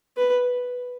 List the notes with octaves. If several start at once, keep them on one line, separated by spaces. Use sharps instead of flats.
B4